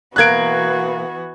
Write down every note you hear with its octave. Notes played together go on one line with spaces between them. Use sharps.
B2 E3 A#3 B3 F#4 F#6 G#6 D7